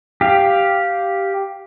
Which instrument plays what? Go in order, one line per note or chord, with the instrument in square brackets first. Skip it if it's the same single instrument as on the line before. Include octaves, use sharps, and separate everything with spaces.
[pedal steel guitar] G4 F5